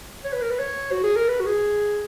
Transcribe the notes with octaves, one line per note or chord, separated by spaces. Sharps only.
C#5
B4
A#4
B4
C#5
F#4
G#4
A#4
B4
F#4
G#4